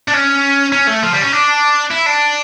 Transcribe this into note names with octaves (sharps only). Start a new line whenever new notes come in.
D4
C#4
C#4
A3
F3
G3
C#4
D4
E4
D4